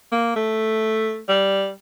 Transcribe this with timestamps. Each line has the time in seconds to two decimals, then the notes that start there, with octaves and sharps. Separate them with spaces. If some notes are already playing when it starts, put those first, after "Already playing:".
0.12 A#3
0.36 A3
1.28 G3